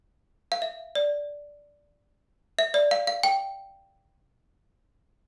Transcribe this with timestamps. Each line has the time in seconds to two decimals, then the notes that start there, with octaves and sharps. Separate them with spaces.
0.52 F5
0.62 E5
0.95 D5
2.59 E5
2.74 D5
2.91 F5
3.07 F5
3.23 G5